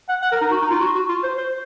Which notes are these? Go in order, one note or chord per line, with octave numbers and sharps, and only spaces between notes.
F#5
F#5
A#4
D#4
F#4
D#4
F4
F#4
F#4
F4
C5
C5